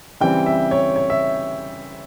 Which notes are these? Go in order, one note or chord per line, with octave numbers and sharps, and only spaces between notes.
C#3 E3 G3 C4 G5
E5
C#5
C#5
E5